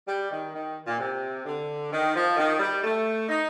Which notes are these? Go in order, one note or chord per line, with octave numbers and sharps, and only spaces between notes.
G3
D#3
D#3
A#2
C3
D3
D#3
F3
D#3
G3
A3
D#4